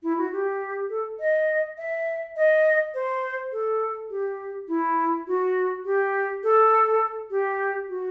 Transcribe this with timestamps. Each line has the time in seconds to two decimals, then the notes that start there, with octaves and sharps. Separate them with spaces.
0.03 E4
0.18 F#4
0.32 G4
0.90 A4
1.19 D#5
1.78 E5
2.36 D#5
2.94 C5
3.52 A4
4.10 G4
4.68 E4
5.27 F#4
5.85 G4
6.43 A4
7.30 G4
7.88 F#4